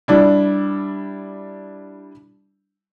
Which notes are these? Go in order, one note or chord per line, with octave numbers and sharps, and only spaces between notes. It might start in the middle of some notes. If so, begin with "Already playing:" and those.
G3 D4 E4